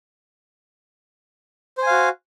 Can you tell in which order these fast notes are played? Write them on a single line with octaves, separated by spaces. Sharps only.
C5 G#5 F5 F#4